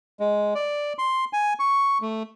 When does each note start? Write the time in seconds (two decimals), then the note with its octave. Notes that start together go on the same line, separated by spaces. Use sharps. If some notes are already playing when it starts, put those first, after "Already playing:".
0.20 G#3
0.55 D5
0.99 C6
1.33 G#5
1.59 C#6
2.02 A3